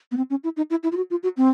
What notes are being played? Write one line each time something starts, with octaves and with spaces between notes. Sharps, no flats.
B3
C4
C#4
E4
D#4
E4
E4
F4
F#4
F4
F#4
C4